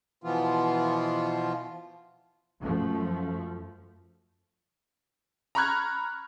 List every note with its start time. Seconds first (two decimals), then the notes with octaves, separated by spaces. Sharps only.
0.24 B2 E3 F3 B3 F4
2.60 F#2 F3 A3
5.55 A#5 B5 C#6 F6 F#6 G#6